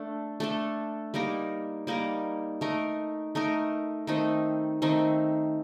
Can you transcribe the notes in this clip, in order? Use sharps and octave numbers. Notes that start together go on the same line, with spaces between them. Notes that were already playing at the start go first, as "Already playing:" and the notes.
Already playing: A3 D4 A4
A3 D4 A4
G3 A#3 D#4 A#4
G3 A#3 D#4 A#4
A3 D#4 A#4
A3 D#4 A#4
D#3 A3 C4 D#4
D#3 A3 C4 D#4